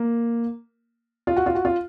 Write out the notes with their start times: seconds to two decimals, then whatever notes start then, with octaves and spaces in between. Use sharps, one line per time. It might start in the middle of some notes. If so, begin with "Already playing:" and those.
Already playing: A#3
1.27 F4
1.36 F#4
1.46 F4
1.55 F#4
1.65 F4